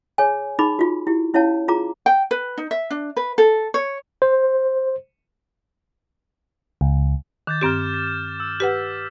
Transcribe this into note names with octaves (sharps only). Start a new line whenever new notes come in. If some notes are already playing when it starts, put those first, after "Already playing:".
G#4 C#5 G#5
D#4 G#4 B5 D6
F4 F#4
E4 G4
C#4 E4 C#5 F5 A5
F4 G#4 A#5 D6
G5
B4
D#4
E5
D4
B4
A4
C#5
C5
C#2
D#3 D6 G6 A6
G2 C4 G4 F6 E7
A6
E6
G4 B4 F#5 B6